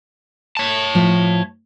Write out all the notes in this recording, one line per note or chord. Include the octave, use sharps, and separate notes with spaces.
C#5 A5
A2 F3